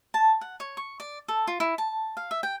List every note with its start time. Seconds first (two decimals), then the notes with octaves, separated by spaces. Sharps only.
0.14 A5
0.41 F#5
0.60 C#5
0.77 C#6
1.00 D5
1.28 A4
1.47 F4
1.60 E4
1.78 A5
2.17 F5
2.31 E5
2.43 G5